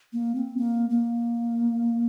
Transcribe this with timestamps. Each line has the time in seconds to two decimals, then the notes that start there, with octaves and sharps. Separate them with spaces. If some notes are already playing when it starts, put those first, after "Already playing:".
0.13 A#3
0.35 C4
0.57 A#3
0.90 A#3